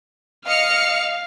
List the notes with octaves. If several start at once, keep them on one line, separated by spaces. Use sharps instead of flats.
D#5 F5 F6 C#7